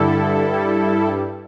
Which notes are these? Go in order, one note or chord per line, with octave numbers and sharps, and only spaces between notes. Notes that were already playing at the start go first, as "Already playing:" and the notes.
Already playing: G2 D3 G3 E4 A4
G2 G3